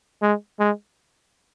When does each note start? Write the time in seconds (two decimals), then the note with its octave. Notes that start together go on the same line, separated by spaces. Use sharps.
0.22 G#3
0.60 G#3